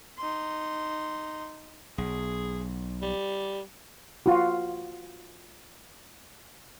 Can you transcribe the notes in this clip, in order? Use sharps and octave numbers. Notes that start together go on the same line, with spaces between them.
D#4 C6
B1 G#4
G3
F4 F#4